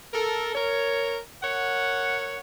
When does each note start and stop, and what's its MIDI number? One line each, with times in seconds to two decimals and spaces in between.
0.14 0.55 69
0.14 0.55 70
0.55 1.18 70
0.55 1.18 73
1.43 2.39 70
1.43 2.39 73
1.43 2.39 78